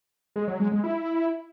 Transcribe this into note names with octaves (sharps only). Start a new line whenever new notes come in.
G#3
F#3
G#3
G#3
E4